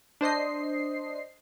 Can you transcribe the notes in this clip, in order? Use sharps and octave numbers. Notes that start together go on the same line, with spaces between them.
D4 C5 D#5 C7